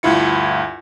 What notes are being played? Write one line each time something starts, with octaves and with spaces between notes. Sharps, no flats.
D2 G2 E4 F4 C#7